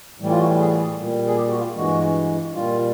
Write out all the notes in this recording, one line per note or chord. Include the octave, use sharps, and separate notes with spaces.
A2 E3 G3
F4
F#4
G#4
A#2 G3
G#4
G4
F#4
F4
G2 E3 G#3 F#4
A#2 G3 F4